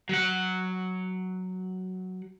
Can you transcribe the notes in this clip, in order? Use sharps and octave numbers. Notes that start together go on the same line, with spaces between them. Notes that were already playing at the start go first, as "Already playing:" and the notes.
F#3 F#5